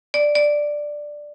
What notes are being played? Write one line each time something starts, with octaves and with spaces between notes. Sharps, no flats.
D5
D5